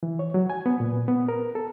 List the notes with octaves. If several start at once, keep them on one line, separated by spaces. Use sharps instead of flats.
E3
C#5
F#3
G#5
B3
A#2
B3
A#4
A4